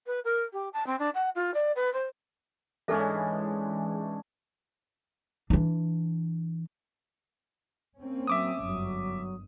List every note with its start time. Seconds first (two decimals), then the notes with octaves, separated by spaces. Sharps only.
0.07 B4
0.24 A#4
0.53 G4
0.73 A5
0.87 C4
0.99 D4
1.14 F#5
1.35 F4
1.54 D5
1.76 B4
1.93 C5
2.88 G#2 E3 G#3 C#4 D4 A4 E5
5.50 E3 D4
7.98 A#3 C4 C#4
8.27 F#3 E5 D6 D#6
8.63 G1 F#2 F#3